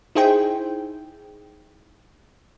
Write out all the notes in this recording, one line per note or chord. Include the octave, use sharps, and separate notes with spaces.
D#4 E4 G#4 C5 G5